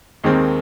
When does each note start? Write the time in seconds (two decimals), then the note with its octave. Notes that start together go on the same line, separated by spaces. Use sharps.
0.24 D#2 D#3 G#3 C4